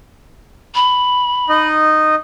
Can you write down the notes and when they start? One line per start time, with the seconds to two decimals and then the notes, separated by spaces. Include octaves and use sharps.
0.75 B5
1.49 D#4 D#5